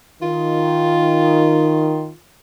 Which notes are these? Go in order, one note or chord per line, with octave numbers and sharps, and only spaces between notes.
D#3 F4